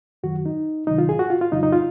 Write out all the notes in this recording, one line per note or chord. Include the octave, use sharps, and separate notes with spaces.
F#2 D#3 F#3 F#4
D#4
C#2 C3 D#3 F#3 D#4
F4
G#4
F#4
F4
F4
F2 C#3 F#3 D#4
D#4
F4